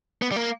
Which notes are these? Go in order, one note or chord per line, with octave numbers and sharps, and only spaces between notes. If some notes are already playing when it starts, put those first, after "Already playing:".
B3
G3
A#3